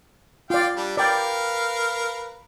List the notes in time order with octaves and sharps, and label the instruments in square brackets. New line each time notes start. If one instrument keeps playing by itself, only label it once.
[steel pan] F4 D5 [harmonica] F5 G5
[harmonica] G3 D4
[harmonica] A#4 B4 F5 [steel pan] D5 G5